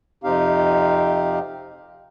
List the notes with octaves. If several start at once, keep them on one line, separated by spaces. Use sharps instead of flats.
F2 C3 C4 D#4 G4 F5